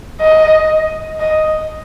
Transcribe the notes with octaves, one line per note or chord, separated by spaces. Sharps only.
D#5
D#5